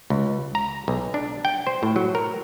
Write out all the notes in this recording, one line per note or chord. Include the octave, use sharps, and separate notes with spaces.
C#2
A#5
B1
D4
G5
C5
A2
F#3
A#4